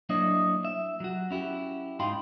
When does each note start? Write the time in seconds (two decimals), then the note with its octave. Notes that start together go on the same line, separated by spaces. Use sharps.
0.09 F#3 A#3 D4 E4 C#5 D#5
0.65 E5
1.00 F#3 F#4
1.31 C#4 E4 F#4 G4
2.00 G#2 D#4 F5 G5 B5 C6